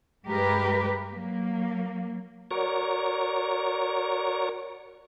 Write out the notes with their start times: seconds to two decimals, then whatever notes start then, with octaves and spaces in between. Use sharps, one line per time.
0.25 G2 G#3 G4 A#4 B4
1.10 F#3 A#3
2.51 F#4 A#4 C#5 D5 A#5 C#6